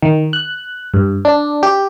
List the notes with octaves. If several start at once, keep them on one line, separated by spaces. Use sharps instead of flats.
D#3
F#6
G2
D4
G4